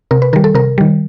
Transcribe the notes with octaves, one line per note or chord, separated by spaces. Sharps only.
C3 A#4
B4
D#3 G3 A#4
A4
C3 A#4
D#3 G3